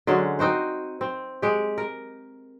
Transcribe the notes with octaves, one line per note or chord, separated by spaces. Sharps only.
D3 F#3 G#3 C#4
C4 D#4 F#4 C5
C4
G#3 G4
A#4